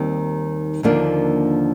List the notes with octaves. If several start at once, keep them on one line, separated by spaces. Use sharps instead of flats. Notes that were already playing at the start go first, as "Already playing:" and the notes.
Already playing: D#2 D#3 G3 C4
D#2 D3 F3 A#3 D4